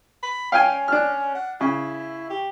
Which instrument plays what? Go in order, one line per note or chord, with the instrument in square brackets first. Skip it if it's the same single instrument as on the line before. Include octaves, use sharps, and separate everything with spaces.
[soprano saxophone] B5
[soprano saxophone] C#4 [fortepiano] F5 G5 G#5
[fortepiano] D4 F6
[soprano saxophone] F#5
[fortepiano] C#3 [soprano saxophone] E4
[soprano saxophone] G4